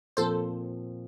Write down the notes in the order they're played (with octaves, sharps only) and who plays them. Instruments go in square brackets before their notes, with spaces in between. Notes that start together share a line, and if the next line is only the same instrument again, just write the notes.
[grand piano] A#2 F3 C4 [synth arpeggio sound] A4 C5